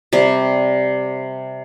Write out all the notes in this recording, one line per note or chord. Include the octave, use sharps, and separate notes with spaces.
C3 G3